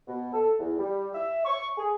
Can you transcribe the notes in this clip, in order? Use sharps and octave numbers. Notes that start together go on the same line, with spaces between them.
B2
A4
E2
G3
E5
C#6
G#4